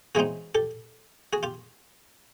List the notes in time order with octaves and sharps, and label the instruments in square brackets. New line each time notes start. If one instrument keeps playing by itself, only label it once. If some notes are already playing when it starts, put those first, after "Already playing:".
[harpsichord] C#3 E3 G#3 C4 D#4 F#4 G#4
G4 A4
F#4 G#4
F4 G4